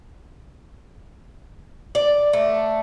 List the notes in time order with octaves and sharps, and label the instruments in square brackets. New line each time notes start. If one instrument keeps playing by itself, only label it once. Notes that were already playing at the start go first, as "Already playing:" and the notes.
[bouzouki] D5
A3